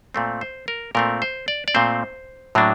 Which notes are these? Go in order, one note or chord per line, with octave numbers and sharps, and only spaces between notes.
A#2 A3 C4
C5
A#4
A#2 A3 C4 A#4
C5
D5
D5
A#2 A3 C4 C5
A2 F#3 A#3 D4